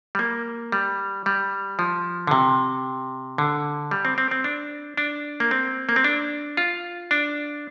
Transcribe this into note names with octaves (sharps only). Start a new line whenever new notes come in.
G3
A#3
G3
G3
F3
D3
C3
D3
G3
C4
C4
C4
D4
D4
A#3
C4
A#3
C4
D4
F4
D4